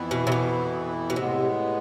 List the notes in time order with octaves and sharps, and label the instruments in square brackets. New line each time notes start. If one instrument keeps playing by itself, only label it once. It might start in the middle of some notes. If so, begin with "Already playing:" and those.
Already playing: [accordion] F2 E3 B3 E4
[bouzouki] B2
C3
B2
B2
[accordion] A2 G#3 B3 [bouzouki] C3